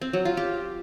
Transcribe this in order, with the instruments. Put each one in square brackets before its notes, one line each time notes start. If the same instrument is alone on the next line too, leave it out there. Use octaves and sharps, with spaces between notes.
[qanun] C4
F#3
F4
G4